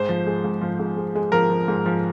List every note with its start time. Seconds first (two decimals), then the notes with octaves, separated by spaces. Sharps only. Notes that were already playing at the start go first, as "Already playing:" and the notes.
Already playing: G#2 C5
0.09 F3
0.27 G#3
0.44 G#2
0.62 F3
0.79 G#2
0.97 G#3
1.15 G#3
1.32 F3 A#4
1.50 F3
1.68 G#2
1.86 F3